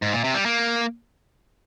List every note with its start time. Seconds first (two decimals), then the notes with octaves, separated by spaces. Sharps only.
0.02 G#2
0.13 A#2
0.24 C3
0.34 G3
0.46 A#3